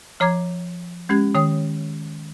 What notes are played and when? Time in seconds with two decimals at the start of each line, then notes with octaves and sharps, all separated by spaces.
0.20 F3 C#5 A#5 D6 G#6
1.09 G#3 C#4 G4 G#6
1.35 D#3 C#5 G5 D#6